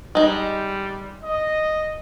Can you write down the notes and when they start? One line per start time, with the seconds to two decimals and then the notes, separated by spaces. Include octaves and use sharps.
0.15 G3 G#3 D#4
1.23 D#5